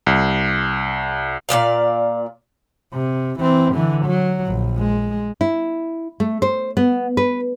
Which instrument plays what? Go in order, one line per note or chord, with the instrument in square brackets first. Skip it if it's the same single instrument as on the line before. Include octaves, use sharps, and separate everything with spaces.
[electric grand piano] C2
[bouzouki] A#2 F3 D5 F5
[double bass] C3
E3 C4
D3 E3
F#3
A#1
G#3
[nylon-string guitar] E4
A3
C5
B3
B4